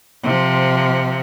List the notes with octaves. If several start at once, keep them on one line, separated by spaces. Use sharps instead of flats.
C3 F3